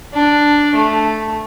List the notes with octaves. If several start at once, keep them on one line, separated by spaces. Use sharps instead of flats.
D4
A3